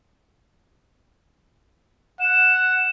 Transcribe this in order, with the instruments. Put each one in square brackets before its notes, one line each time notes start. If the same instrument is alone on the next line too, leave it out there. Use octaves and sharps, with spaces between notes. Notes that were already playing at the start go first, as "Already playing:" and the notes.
[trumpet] F#5 [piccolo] E7